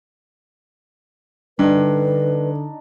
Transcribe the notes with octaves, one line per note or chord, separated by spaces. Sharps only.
G2 D3 D4 D#4 B4